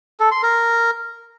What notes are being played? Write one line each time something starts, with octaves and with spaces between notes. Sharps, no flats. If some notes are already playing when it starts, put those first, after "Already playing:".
A4
C6
A#4